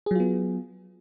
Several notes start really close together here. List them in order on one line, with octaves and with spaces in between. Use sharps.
G#4 F#3 F4 B3